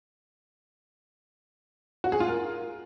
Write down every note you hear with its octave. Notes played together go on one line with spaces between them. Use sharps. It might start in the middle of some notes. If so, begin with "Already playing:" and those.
F#4
G#4
F4
A#4